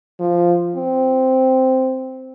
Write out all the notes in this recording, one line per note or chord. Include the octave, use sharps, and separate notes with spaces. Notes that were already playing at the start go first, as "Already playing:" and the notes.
F3
C4